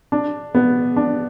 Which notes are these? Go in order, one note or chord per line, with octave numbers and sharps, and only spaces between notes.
D4
B3
D4